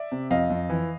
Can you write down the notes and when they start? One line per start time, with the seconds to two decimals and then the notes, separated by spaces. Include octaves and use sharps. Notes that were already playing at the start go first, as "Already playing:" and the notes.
Already playing: D5 E5
0.12 C3
0.31 F2 D#5 F5
0.50 F2
0.70 E3